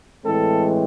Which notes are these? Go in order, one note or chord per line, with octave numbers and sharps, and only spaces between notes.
A2 E3 G#3 C4 A4